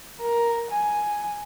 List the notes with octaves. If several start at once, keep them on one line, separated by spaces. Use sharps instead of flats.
A#4
G#5